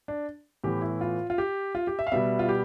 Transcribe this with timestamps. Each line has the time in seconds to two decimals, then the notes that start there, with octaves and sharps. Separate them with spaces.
0.08 D4
0.64 A2 E3 B3 G4
0.82 E4
1.01 F4
1.30 F4
1.38 G4
1.75 F4
1.87 G4
1.99 E5
2.07 F5
2.12 B2 G3 B3 E5
2.39 F4
2.49 G4